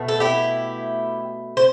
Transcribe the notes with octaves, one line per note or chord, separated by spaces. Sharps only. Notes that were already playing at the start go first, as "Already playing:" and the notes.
Already playing: B2 A3
A4
E4 G4
C5